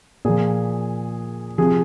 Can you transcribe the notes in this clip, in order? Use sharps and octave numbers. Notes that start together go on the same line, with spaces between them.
A#2 F3 G#4
C3 F3 G#4